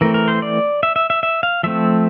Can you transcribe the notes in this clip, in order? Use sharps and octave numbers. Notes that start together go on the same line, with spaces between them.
E3 A3 C4 A#4
A#4
C5
D5
E5
E5
E5
E5
F5
F3 A3 C4 E5